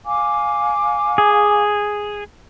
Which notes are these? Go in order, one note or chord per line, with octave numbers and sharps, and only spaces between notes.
F5 G#5 D6
G#4